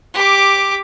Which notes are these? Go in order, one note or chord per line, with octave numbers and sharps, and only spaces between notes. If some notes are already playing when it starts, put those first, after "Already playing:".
G4 D6